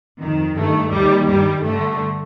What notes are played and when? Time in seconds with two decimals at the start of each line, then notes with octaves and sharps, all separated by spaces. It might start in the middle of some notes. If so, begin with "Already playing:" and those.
0.20 F2 D#3
0.56 G2 D#3 A3
0.91 D#2 D#3 G3
1.28 G2 D#3 G3
1.63 G2 D3 A3